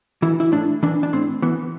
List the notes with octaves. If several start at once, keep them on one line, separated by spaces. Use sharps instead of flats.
E3 E4
E4
A2 D4
E3 D4
D4
A2 C4
E3 B3